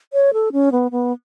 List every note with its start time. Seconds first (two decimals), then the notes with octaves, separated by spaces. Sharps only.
0.13 C#5
0.33 A4
0.52 C#4
0.72 B3
0.91 B3